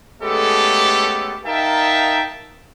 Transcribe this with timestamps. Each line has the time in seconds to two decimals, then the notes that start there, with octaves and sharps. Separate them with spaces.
0.22 G#3 A3 B3 C#4 G4 A4
1.46 D#4 A#4 E5 F5 G5 A5